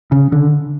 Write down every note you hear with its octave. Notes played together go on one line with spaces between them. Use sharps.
C#3
D3